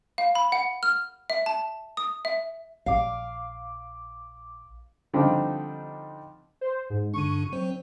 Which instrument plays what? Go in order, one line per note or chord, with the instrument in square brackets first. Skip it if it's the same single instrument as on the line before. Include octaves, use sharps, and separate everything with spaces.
[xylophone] F5
B5
F#5
F6
E5
A5
D#6
E5
[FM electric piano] A#1 D6 [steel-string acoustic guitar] F5
[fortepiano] D3 F3 G3 C4 D4 D#4
[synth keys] C5
G#2
[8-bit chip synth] G2 D3 D4 [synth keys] C#6 D#7
[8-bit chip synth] F#3 C4 C5